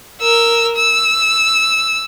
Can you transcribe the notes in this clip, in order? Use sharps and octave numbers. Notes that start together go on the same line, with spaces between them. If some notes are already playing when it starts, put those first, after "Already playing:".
A#4 E6
E6